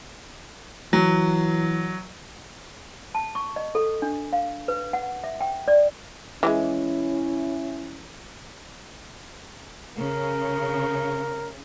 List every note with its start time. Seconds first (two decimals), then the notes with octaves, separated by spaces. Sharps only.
0.93 E3 F#3
3.15 A5
3.35 C#6
3.56 D#5
3.75 A4
4.02 D4
4.33 F5
4.68 B4
4.93 F#5
5.24 E5
5.41 G5
5.68 D5
6.43 E3 G3 G#3 C#4 E4
9.97 C#3 A#4